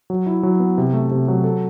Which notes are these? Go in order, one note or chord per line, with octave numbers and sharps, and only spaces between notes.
F#3
E4
F#3
B3
C3
A3
C3
F#3
A4